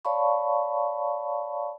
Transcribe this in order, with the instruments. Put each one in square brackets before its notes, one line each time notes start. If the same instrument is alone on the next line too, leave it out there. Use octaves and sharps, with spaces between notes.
[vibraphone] C#5 D5 F5 A5 B5 C#6